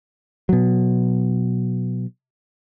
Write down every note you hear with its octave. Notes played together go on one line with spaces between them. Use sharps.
B2 F#3